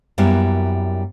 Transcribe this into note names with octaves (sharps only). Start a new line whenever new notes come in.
F#2 G3 A#3 B3 E4